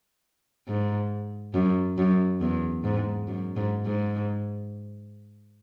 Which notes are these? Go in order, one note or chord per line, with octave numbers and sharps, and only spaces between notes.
G#2
F#2
F#2
E2
G#2
F#2
G#2
G#2